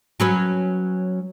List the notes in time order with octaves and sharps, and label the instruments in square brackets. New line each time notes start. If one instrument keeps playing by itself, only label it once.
[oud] F#3 C#4 B4